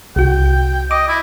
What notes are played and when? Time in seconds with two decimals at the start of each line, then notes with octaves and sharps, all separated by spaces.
0.16 C2 F#4 G5
0.91 D#5 D6
1.08 E4